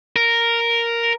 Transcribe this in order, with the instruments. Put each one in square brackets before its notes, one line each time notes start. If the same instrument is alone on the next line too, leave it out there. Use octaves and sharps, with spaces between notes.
[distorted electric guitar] A#4